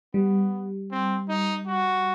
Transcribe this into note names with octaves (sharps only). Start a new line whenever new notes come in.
G3 B3
C4
D#4
F#4